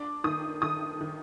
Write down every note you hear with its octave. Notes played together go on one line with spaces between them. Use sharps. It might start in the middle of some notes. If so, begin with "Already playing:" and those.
Already playing: D4 D6
D#3 D#6
D#3 D#6
D#3